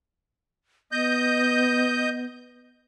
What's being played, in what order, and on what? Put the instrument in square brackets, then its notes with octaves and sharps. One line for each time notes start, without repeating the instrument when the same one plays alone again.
[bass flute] B3 [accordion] D#5 G6